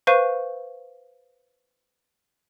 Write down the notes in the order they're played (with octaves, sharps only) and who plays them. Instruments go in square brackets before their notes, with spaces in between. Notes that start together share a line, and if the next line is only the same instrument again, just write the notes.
[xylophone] B4 C5 F5 C#6 G6 D#7